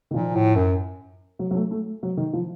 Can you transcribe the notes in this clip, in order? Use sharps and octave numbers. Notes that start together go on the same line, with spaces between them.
D#3
A#2 F3
A2
F#2
F#3
F#3
A3
A3
F#3
D#3
F3